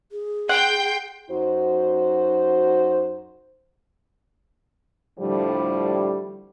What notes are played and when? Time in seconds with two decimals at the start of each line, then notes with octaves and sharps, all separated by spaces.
0.12 G#4
0.49 F#5 G5 C6 G6
1.30 F#2 D#4 F#4 C5
5.19 A2 D3 F3 G3